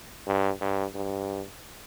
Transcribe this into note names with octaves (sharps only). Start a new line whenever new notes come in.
G2
G2
G2